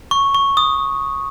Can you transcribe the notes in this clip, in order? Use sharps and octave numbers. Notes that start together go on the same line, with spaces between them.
C#6
C#6
D#6